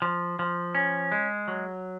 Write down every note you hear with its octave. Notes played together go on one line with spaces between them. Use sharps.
F3
F3
C#4
G#3
F#3